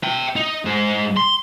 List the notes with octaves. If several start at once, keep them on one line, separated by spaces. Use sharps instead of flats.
E5 G5
D#4
G#2 C5
C6